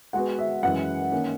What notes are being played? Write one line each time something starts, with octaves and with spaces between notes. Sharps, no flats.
G#3 B3 F#4 B4 F#5
E5
F#2 E3 G#3 F#5
D#3 A#3 C#4